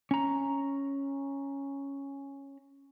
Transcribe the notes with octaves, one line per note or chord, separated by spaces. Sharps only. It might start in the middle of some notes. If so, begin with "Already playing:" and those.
C#4 A#5